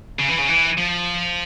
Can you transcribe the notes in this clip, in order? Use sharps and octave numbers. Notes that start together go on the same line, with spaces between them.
C#3
E3
C#3
E3
F3